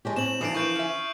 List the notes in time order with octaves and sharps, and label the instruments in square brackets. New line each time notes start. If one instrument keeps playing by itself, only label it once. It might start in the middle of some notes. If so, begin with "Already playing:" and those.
[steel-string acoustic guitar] G#3 A3 G4
[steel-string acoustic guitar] A2 C4 [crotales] E7 F#7
[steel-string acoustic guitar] E3 F3 [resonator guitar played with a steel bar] G3 A3 D4 [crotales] D#6 C7 D7
[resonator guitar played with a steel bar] E4 A#4 B4 [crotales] C#6 G6 E7
[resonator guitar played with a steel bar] C#4 E5